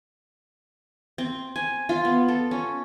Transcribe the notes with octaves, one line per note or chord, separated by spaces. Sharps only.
C4
G#5
F4
B3
A4
C#4